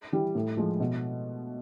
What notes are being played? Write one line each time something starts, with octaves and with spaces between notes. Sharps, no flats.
E3 G3
A2
F3 G#3
B2